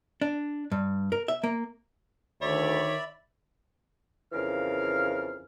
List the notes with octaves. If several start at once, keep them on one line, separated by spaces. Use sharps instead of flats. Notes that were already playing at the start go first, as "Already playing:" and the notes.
D4
G2
A#4
E5
A#3
D2 D#3 C#5 D5 E5 B5
F2 C#3 E3 A#4 F5 F6